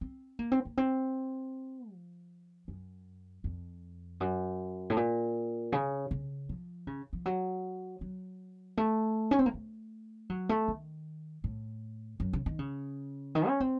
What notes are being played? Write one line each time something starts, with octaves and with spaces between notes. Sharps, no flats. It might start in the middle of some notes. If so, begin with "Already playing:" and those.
C4
A#3
C4
A#3
C4
F3
F#2
F2
F#2
A2
A#2
C#3
C#3
F3
C#3
F3
F#3
F#3
A3
C#4
C4
A#3
A3
F#3
A3
D#3
A2
F#2
C#3
D#3
C#3
D#3
C#4
C4